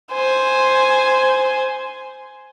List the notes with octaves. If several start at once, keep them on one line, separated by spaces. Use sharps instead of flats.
C5 G#5